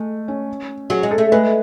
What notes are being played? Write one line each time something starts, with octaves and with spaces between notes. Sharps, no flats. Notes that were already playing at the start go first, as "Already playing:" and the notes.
Already playing: G#3 A3
C#4
F#3 G#4
G#3
A4
A3
G#3 B4